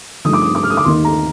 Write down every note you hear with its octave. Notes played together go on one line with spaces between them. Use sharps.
G2 F3 A3 D#4 D#6
D6
D#6
D6
F6
D#6
D6
D#2 D#3 A#3 D#4 C6
A#5